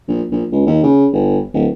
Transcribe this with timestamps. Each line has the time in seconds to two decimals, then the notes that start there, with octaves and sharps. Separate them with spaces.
0.08 A#1
0.32 A#1
0.52 C#2
0.67 D#2
0.83 C#3
1.13 G1
1.54 D1